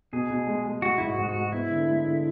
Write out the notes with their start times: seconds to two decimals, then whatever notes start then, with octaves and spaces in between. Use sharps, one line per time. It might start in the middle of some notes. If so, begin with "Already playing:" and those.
0.13 B2 G#4
0.30 B2
0.47 G#3
0.65 G#3
0.82 G#3 F#4
0.98 G#2 E4
1.06 F#4
1.18 G#2
1.29 F#4
1.35 G#3
1.52 B3 E4
1.70 D3
1.88 G#3
2.05 D3